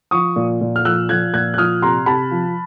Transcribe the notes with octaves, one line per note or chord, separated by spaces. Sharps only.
F3 C#6 D#6
A#2
A#2
F6
F3 E6 F#6
F3 F#6 G#6
A#2 F#6 G#6
F#6
F3 D#6 F6
C3 A#5 C6
C3 A5 B5
F3